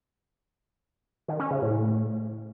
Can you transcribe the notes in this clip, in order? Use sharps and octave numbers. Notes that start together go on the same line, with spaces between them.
D#3
C#4
C#3
A2